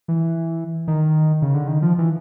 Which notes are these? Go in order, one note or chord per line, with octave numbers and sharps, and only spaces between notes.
E3
D#3
C#3
D3
D#3
F3
E3